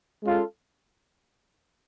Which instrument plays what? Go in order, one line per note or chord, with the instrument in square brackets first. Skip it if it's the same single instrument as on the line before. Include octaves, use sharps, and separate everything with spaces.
[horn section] G#3 C#4 F4 A4